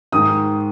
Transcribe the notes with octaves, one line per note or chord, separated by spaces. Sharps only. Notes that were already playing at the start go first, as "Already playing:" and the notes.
G#2 D#3 G#3 D#6